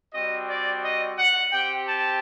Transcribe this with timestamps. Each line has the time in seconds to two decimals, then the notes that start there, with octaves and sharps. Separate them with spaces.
0.14 G3 C4 F#4 D#5
0.48 D5
0.83 D#5
1.18 F#5
1.52 C4 G4 G5
1.87 A5